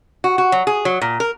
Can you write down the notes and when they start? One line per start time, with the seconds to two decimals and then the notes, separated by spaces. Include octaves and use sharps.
0.24 F#4
0.38 F#4
0.52 F#3
0.67 G#4
0.85 F#3
1.02 A#2
1.20 A#4